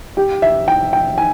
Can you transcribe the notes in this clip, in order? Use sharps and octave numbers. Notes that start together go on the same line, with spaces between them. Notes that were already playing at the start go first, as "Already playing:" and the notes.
G4
E5
G5
G5
G#5